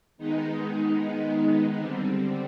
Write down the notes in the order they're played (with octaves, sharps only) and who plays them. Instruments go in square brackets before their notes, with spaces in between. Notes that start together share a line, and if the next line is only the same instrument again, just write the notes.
[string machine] D#3 G#3 B3 D#4
D3 G3 C4